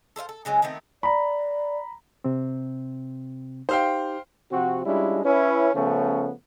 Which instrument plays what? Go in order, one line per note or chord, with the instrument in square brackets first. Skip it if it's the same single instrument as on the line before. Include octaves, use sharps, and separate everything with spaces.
[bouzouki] A4 C5 E5 F5
A4
C#3 F#3 G#3 C#4
D#3 A3 B3 C4
[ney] D5 [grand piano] A#5 B5
[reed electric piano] C3 C4
[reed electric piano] D#4 G4 [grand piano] C5 F5 G5
[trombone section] C3 F3 C4 F#4
G3 G#3 C#4 D4 E4 F4
C#4 E4 B4
C#3 F3 A3 B3 C#4